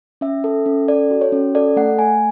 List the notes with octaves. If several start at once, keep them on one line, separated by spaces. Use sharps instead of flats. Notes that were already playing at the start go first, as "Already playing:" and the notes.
C#4 E5
A4
C#4
A4 D5
F#4
C#5
C#4
A4 D5
A3 F#5
A3 G#5